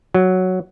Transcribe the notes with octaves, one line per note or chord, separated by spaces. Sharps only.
F#3